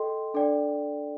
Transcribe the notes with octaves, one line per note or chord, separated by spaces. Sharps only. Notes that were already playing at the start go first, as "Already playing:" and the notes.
Already playing: A4 D#5 G5 C6
D4 A4 D5 G5